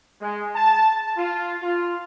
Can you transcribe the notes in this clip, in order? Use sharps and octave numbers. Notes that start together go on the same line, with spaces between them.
G#3
A5
F4
F4